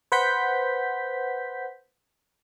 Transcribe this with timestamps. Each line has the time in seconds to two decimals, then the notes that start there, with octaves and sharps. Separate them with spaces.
0.12 B4 C5 F#5 G6 B6